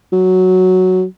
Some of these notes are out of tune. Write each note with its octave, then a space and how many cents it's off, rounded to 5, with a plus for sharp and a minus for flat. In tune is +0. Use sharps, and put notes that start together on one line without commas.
F#3 +0